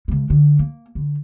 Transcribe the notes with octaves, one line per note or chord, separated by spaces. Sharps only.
C#3 G#3
D3
A#3
D3